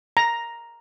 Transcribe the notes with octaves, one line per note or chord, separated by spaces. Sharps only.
A#5